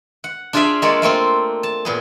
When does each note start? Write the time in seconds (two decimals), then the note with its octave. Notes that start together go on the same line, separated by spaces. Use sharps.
0.24 F#5
0.53 D4 F4 G#4 D5 E5 F5
0.82 G#3 A#3 F4 A4 C#5 D5
1.02 A3 A#3 C4 F4
1.63 A5
1.85 A#2 B3 G#4